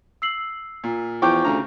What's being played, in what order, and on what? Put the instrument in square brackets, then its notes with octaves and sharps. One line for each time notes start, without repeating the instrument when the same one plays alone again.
[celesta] E6 C7 F#7
[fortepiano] A#2
[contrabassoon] E2 [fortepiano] F3 G5 D6 [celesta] C#6 G6
[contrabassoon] D2 [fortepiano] C#3 A#5